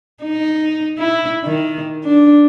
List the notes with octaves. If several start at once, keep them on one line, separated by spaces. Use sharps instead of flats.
D#4
E4
D#3
D4